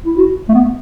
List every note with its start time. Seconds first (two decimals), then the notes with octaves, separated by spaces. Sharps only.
0.05 E4
0.17 F#4
0.49 A3
0.54 B3